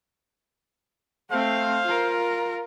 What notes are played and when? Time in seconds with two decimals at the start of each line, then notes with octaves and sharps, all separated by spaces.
1.30 A3 C4 C5 F5
1.85 F4 A#4